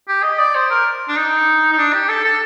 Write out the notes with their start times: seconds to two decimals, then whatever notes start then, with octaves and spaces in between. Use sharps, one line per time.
0.08 G4
0.23 D#5
0.39 D5
0.55 C5
0.70 A#4
1.09 D4
1.16 D#4
1.72 D#4
1.78 D4
1.93 G4
2.09 A4
2.24 A4